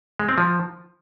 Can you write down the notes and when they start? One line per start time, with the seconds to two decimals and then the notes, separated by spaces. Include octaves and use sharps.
0.19 G#3
0.29 C4
0.38 F3